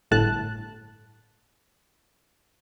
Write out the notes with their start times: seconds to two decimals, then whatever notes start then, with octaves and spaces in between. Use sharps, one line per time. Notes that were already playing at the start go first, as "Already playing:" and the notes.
0.11 G1 A2 A5 F#6